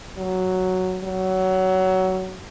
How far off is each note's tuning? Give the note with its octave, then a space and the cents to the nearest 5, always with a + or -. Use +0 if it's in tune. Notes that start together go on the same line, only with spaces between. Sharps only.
F#3 +5
F#3 +20